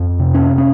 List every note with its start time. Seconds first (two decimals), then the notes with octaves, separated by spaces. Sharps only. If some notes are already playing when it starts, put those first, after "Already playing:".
Already playing: F2
0.19 C3
0.34 C#4
0.58 C#4